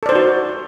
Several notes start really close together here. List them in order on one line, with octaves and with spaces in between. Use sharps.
A4 D5 C5 D#4 F#4